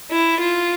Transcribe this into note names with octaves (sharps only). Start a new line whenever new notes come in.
E4
F4